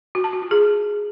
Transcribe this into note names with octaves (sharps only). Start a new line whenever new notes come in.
F#4
A5
F#4
F4
G#4